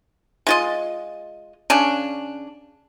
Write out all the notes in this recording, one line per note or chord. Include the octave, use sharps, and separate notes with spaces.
G#3 F4 D#5
C#3 C#4 D4